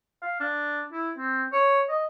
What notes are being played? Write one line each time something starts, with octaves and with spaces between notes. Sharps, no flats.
F5
D4
E4
C4
C#5
D#5